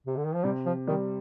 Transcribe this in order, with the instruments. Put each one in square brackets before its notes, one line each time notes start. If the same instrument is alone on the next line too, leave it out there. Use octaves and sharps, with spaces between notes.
[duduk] C3
D3
D#3
F3
[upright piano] C3 [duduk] G3
[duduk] F3
[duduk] D#3 [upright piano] G3